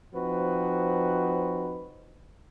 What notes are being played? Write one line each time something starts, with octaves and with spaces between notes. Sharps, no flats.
F3 C4 D#4 F#4 B4